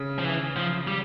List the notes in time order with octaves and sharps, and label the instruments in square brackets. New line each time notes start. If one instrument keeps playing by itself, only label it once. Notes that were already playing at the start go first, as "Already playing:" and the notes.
Already playing: [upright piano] C#3
[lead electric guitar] F3
E3
F3
G3